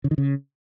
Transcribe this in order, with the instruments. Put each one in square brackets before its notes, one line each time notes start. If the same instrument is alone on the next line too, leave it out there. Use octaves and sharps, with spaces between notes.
[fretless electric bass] C#3
D#3
C#3